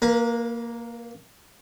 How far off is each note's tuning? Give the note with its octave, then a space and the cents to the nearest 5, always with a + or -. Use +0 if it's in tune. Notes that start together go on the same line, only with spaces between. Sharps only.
A#3 +0 B4 -40